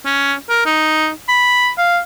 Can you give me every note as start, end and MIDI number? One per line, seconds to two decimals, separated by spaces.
0.06 0.33 61
0.50 0.62 70
0.66 1.09 63
1.29 1.69 83
1.78 1.99 77